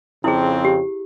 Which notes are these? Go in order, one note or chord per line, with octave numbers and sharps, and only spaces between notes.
F2 C#3 C4 E4 G#4
G4